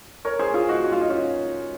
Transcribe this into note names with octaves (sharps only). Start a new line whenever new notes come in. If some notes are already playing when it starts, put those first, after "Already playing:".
A#4 C#5
G#4 C5
F4 G#4
D#4 F#4
F#4
F4
D#4
C#4 F4